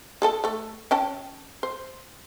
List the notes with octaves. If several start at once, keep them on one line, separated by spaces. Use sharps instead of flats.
G#4 A4 A5
A3 A4
C#4 G5 A5
C5